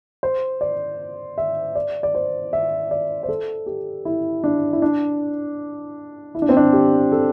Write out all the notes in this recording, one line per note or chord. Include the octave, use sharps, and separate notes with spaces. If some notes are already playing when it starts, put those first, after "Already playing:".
C5
D5
E5
D5
D5
C5
E5
D5
C5
A4
G4
E4
D4
E4
D4
E4
D4
C4
D4
G4
A4